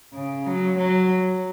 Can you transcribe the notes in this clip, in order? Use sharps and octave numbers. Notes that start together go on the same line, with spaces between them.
C#3
F#3
F#3